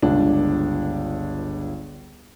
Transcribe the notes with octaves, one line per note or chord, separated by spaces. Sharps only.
G1 C#2 D4